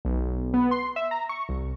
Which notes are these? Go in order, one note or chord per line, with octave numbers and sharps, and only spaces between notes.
B1
B3
C6
E5
A#5
C#6
C2